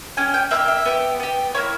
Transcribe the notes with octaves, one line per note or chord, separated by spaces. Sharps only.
C#4 G4 G#5
G5
A#3 E4 G4 E5
E5
B3 G4
B3 G4
A#3 C#4 E4 C#5